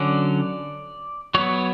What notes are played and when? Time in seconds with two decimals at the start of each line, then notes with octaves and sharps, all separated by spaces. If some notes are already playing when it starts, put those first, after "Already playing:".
Already playing: D3 F#3 C#4 D5
1.34 F#3 B3 C#5